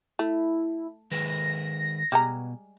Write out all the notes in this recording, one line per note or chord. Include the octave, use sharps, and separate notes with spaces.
A3 E4
D#3 G#3 B4 A#6
B2 G3 G#3 A#5